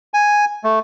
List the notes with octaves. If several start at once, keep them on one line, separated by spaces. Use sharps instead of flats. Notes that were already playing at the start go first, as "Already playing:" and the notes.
G#5
A3